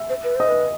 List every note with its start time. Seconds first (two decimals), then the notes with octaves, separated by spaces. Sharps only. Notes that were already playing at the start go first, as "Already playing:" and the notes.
Already playing: E5 E6
0.09 C5
0.24 B4
0.36 C5 D#5 D#6
0.48 B4